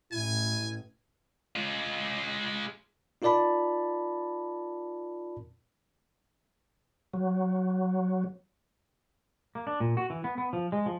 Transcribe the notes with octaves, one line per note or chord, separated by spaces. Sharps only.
A1 E4 G#5
G#3 F4
D#4 F4 A#4 D5 A5 B5
F#3
A#3
D4
A#2
F#4
E3
B3
B3
F3
G#3
F3